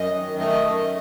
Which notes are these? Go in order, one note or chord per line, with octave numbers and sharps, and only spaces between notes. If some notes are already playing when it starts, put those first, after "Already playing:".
Already playing: F#2 D#5
D#3
A3 D#5
F#2